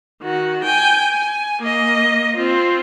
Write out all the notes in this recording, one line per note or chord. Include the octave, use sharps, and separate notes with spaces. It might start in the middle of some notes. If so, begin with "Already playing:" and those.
D#3 F#4
G5 G#5
G#5
A#3 D#5
C4 F4